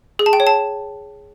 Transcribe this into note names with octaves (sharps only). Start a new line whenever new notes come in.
G#4
A5
G5
C#5
A5